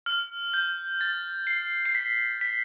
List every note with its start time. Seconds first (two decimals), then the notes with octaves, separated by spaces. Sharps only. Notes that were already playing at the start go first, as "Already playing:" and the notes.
0.06 F6
0.54 G6
1.01 A6
1.47 C7
1.85 C7
1.95 B6
2.41 B6